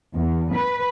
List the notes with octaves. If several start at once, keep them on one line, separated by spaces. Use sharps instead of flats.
E2
B4